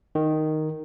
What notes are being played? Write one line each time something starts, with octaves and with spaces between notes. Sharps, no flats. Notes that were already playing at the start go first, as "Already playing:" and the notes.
D#3